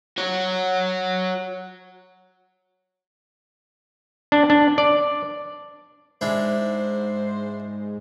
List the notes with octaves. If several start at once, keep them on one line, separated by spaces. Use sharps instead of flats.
F#4 C#5
D4
D4
D5
G#2 G#3 D4 E4 C5